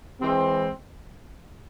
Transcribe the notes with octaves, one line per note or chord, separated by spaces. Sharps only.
E3 G#3 C4